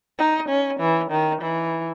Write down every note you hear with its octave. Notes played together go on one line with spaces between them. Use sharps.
D#4
C#4
E3
D#3
E3